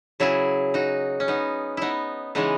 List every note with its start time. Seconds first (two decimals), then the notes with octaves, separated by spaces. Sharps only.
0.20 C#3 F#3 E4 G#4
0.74 D#4 F#4
1.20 C#4
1.28 B3 D#4
1.77 B3 D#4 E4
2.35 C#3 E3 G#3 B3 D#4